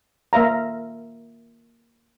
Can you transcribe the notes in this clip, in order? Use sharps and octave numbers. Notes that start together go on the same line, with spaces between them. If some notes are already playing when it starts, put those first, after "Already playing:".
A#3 E5 F5 A#5